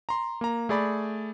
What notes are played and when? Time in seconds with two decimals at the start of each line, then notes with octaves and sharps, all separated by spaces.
0.09 A#5 C6
0.41 A#3 A#5
0.69 A3 G#4 D5 B5